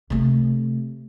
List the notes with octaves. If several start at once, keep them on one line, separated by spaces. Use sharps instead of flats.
C3 A3